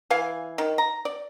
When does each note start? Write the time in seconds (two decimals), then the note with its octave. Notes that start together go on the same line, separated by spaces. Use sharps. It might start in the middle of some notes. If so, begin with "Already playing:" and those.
0.10 E3 F5 G#5
0.58 D#3
0.78 A#5
1.05 D5